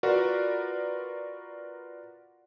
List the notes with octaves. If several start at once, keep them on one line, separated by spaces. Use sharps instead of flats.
F4 F#4 A#4 B4 D5